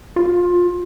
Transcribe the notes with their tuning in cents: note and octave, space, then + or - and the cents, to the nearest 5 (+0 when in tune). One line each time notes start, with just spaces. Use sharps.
F4 +20